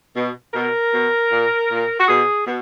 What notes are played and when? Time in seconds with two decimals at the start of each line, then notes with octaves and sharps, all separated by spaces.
0.16 B2
0.54 B2 A#4
0.93 B2
1.31 A#2
1.71 A#2
2.00 F#4
2.08 B2 G#4
2.47 B2